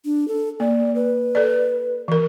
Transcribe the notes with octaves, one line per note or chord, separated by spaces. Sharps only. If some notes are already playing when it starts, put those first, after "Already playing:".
D4
A4
A#3 D5
B4
A4 D5
E3 A#4